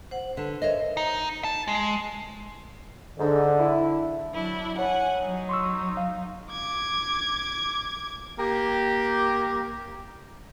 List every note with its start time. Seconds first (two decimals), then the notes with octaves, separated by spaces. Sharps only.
0.11 C5 F#5
0.37 D3 B4 A5
0.62 A#4 C5 C#5 D#5 E5
0.97 D#4
1.44 A5
1.68 G#3
3.19 G#2 D3
3.59 E4
4.33 F#3 D4 E4
4.79 C#5 F#5 G#5
5.18 F#3 D#4
5.49 C6 C#6 E6
5.97 F5
6.51 D6 G#6
8.39 A#3 G4